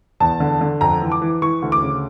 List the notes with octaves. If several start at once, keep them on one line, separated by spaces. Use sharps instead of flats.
E2 A5
D3
D3
F2 A#5
E3
D6
E3
E3 C#6
D2
D6
C#3